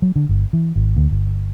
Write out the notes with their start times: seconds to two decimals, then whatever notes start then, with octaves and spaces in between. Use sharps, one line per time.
0.02 F#3
0.16 D3
0.29 G1
0.53 E3
0.76 G#1
0.97 D2
1.11 G1